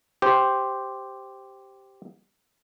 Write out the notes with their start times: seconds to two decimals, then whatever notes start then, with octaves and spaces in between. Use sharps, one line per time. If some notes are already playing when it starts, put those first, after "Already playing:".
0.22 G4 C5